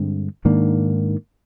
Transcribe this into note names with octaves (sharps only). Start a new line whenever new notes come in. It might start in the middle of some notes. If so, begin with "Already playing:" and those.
Already playing: G2 D3 G#3 C4
G#2 D#3 A#3 D4